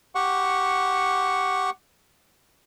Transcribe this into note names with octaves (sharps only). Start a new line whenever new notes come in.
G4 F#5 C#6